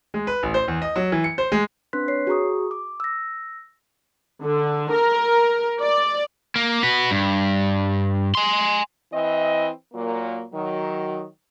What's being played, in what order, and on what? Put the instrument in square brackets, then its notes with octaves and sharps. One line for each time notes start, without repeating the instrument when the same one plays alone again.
[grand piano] G#3
B4
A1
C5
E2
D#5
F#3
E3
C#7
C5
G#3
[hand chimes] C4 D4 B4 C6 F#6 B6
C#5 C7
F#4 G#4 A#5 C#6 D#6
D6
E6 A#6
[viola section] D3
A#4
D5
[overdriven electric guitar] A#3
F#4 B4
G2
G#5 C6
[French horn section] E3 C4 E4 D#5
A#2 F#3 A#3
D#3 F#3